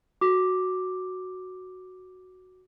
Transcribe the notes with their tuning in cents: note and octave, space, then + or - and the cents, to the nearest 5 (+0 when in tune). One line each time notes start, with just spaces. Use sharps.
F#4 +0 D6 +0